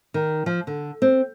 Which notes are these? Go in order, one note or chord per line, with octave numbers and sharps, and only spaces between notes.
D#3
F3
D3
C4